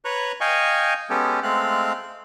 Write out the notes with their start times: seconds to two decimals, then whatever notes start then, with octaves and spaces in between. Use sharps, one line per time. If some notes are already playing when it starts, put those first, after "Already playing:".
0.05 B4 C#5 A#5 C#6 F#6
0.41 D#5 F5 G5 G#5 C#6
1.10 G#3 B3 C#4 G4 A4
1.43 G#3 A3 C4 F5 F#6